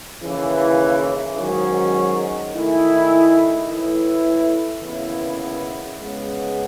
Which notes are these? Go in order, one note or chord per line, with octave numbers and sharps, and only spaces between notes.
D#2 C#3 E3
G#2 D#3 F#3 C#4 G#4
D#3 A3 E4 G#4
A2 E3 A3 E4
D#2 C#3 E3 B3 E4
C#3 G#3 B3